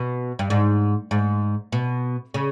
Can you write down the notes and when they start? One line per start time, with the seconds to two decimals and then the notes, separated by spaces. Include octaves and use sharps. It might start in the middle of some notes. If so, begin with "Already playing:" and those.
Already playing: B2
0.39 G2
0.50 G#2
1.11 G#2
1.72 B2
2.34 C#3